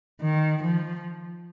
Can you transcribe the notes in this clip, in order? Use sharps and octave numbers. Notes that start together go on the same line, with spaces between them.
D#3
F3